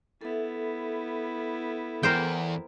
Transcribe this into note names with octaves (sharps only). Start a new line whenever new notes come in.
B3 E4 A4 E5
E2 A#4 C5 G5